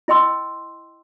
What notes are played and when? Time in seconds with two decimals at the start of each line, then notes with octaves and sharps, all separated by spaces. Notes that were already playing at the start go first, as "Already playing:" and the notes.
0.08 E4 D#5 G5 C6 E6